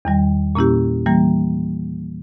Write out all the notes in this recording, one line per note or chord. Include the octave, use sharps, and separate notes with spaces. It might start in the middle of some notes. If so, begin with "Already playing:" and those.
E2 D#3 G3
A#2 A#3 C#4 E4 G4
E3 G3 A#3